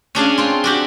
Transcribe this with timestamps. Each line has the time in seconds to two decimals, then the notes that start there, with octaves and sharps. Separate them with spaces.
0.15 C#4 D4 G#4 F5
0.38 C4 F4
0.64 D4 F#4 G4